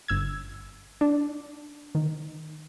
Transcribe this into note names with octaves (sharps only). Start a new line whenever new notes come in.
G1 E6 G#6
D4
D#3